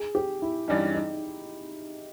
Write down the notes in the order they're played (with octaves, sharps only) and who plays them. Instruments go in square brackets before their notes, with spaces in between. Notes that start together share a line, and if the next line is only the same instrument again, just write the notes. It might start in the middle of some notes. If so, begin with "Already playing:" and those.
Already playing: [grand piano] G#4
G4
E4
[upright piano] G2 E3 G3 C#4 [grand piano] D#4
[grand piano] D#4